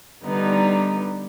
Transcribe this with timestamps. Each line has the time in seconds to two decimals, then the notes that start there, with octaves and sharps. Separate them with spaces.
0.23 D3 G3 B3 D#4